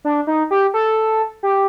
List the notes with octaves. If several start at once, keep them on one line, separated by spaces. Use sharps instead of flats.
D4
D#4
G4
A4
G4